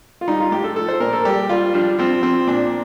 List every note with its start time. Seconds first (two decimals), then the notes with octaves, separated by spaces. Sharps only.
0.21 F4
0.28 G3 D#4
0.40 F4
0.51 A2 G4
0.64 A4
0.76 F3 A4
0.89 C5
1.00 A#2 A#4
1.13 A4
1.25 G3 G4
1.49 G3 F4
1.74 F3 D4
1.99 F3 C4
2.23 F3 C4
2.48 A#2 D4